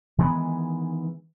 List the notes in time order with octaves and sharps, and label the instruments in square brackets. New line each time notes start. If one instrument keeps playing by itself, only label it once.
[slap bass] D#3 E3 G#3 B3